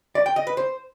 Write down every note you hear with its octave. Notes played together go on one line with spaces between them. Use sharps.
D5
G5
D#5
B4
C5